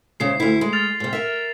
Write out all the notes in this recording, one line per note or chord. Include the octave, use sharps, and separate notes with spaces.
G#2 C#3 E4 C7
D2 E4
G#3
F6 A6 F7
G#2 C3
A#4 E5